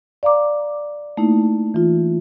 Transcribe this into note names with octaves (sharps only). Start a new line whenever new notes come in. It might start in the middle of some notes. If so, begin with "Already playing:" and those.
D5 F5 A#5 D6
A3 A#3 D#4 E4
E3 F4